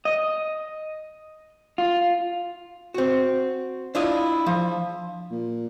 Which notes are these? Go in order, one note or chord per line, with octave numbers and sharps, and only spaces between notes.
D#5
F4
C4 F#4
D4 E4 F4 D#5
F3
A#2